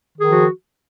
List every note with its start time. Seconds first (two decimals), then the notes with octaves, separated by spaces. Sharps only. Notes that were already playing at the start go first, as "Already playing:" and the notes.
0.16 D#3
0.21 G#4
0.26 F3
0.31 F#4